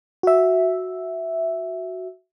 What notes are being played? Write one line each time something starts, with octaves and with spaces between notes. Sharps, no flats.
F#4 E5